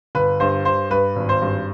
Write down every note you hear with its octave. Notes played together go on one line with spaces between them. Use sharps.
G1 B4
G2 C5
G2 C5
G2 B4
G#1
C5
G2